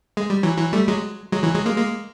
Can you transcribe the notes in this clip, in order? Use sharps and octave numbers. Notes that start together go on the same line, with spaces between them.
G#3
G3
E3 F#3
E3 F#3
G3 A3
F#3 G#3
F#3 G#3
E3 F#3
F#3 G#3
G#3 A#3
G#3 A#3